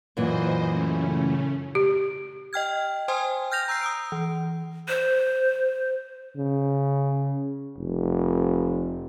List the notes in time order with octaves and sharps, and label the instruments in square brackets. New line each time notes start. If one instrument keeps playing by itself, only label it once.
[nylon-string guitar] F#2 A#2 E3 [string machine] C5 D#5
[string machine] C#3 A3 C#4
[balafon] G4
[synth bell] D#5 G5 F6 G#6
C5 G5 G#5 C6 D#6 G#6
F6 G6 A#6 F7
A#5 E6 G6 C7
D#6 E6 D7
E3
[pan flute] C5
[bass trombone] C#3
F1